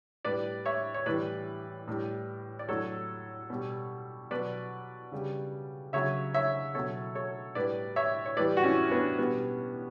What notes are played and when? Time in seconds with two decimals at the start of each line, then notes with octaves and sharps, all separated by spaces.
0.25 A2 G3 B4 D5
0.66 C#5 E5
0.94 C#5
1.06 A2 E3 G3 B4 D5
1.88 A2 G3
2.59 D5
2.68 A2 F#3 A4 C#5
3.50 B2 G3
4.31 B2 F#3 B4 D5
5.12 C#3 G3
5.93 C#3 F#3 C#5 E5
6.34 C#5 E5
6.75 B2 F#3 A4 C#5
7.15 A4 C#5
7.55 A2 G3 B4 D5
7.96 C#5 E5
8.26 C#5
8.37 A2 E3 G3 B4 D5
8.57 F#4
8.64 C#4 E4
8.91 B3 D4
9.18 B2 G3 B3